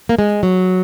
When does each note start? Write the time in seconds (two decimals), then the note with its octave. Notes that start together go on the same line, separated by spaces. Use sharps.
0.09 A#3
0.19 G#3
0.43 F#3